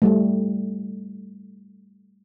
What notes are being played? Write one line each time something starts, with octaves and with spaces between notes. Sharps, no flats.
G3 A3